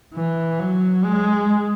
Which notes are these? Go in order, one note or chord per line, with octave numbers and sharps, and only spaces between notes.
E3
F#3
G#3